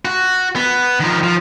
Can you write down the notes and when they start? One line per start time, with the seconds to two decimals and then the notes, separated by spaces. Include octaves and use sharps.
0.05 F#4
0.56 B3
1.00 D#3 F3
1.24 F3